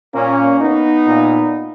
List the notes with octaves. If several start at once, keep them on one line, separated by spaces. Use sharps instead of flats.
A#2 A#3 C#4
B3 D#4
A#2